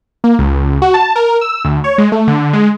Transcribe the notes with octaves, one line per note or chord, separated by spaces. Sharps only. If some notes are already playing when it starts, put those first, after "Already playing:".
A#3
C#2
F#4
A5
A#4
E6
D2
C#5
G#3
A3
D3
G#3